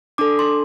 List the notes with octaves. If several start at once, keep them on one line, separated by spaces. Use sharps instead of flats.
D4 A4 D6
C6